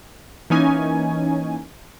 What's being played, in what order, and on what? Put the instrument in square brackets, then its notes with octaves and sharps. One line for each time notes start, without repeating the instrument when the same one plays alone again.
[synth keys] E3 A#3 C#4 D#4 G#5